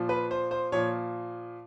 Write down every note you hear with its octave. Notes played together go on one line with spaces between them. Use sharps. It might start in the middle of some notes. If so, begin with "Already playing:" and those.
Already playing: A#2 F3
B4
C5
C5
A#2 F3 C#5